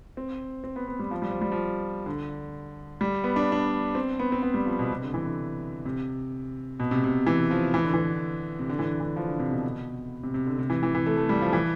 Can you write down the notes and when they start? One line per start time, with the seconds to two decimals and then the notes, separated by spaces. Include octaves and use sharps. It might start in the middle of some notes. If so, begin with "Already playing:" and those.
0.17 C4
0.64 C4
0.76 B3
0.88 B3
0.99 G3
1.11 F3
1.22 G3
1.31 F3
1.42 G3
1.52 F3
2.06 D3
3.01 G3
3.24 B3
3.36 D4
3.52 D4
3.95 C4
4.19 B3
4.32 C4
4.42 B3
4.54 G3
4.66 F3
4.79 B2
4.91 C3
5.02 D3
5.14 E3
5.25 D3
5.85 C3
6.80 B2
6.91 C3
7.04 C3
7.27 E3
7.51 F3
7.74 E3
7.84 D3
7.94 E3
8.59 C3
8.69 D3
8.79 E3
8.84 D3
9.00 E3
9.16 F3
9.28 D3
9.39 C3
9.52 B2
10.23 C3
10.34 C3
10.47 D3
10.59 C3
10.70 E3
10.83 E3
10.95 E3
11.06 A3
11.17 A3
11.29 G3
11.42 F3
11.53 E3